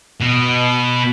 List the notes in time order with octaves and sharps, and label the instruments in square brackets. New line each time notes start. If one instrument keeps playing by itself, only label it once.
[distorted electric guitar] B2